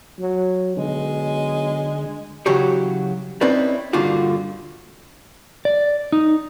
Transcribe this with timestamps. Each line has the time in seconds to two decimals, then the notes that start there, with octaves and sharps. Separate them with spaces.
0.20 F#3
0.77 B1 D3 G#3
2.46 C#3 E3 F#3 F#4 G4 C#5
3.41 C4 C#4 D#4 E4 B4 D5
3.93 G2 A#2 D3 D#4 F4 F#4
5.65 D5
6.12 D#4